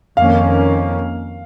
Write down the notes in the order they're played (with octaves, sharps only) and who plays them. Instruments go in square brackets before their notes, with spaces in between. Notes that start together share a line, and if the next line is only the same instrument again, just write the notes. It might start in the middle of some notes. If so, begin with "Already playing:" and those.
[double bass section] F2 D#3 A#3 C#4 [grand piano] F5